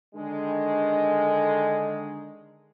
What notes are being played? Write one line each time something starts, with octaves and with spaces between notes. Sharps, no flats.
D3 D#3 G#3